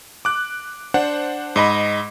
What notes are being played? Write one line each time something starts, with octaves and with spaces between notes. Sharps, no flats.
D6 F#6
D4 C5 F#5
G#2 D#5 B5